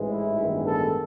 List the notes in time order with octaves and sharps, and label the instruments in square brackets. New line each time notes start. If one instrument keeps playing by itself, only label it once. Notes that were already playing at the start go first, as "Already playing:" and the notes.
Already playing: [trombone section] A1 G#2 E3 G#3
E4
A1 G2 D#3 G#3 B3
A4